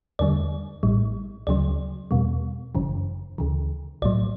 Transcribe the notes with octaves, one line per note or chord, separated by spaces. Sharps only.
E2 D3 G3 D5
A1 A2 G3
D2 C#3 F#3 D5
E2 B2 G3
G1 F#2 C#3 E3
D2 C#3 E3
B1 A2 F#3 D5